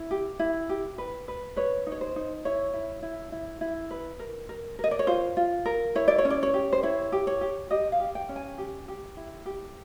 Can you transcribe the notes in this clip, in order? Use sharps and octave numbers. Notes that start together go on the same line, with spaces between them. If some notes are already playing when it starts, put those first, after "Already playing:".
Already playing: E4
G4
E4
G4
B4
B4
B4 C#5
D#4
C#5
C5
D#4
E4 C#5
E4
E4
E4
E4
B4
A#4
A#4
A#4
D#5
D5
C#5
F4 C5
F4
A#4
E4 C#5
D5
C#5
C#4
D5
C#5
G4
C5
E4 C#5
G4
C#5
G4
G4 D#5
F5
G4
G5
C#4
G#5
G4
G4
E4
G4